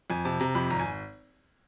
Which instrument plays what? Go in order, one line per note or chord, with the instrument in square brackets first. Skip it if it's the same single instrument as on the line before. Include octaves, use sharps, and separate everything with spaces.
[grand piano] F2 G#5
C3 A5
C3 A#5
F2 B5
G#1 A#5
G#5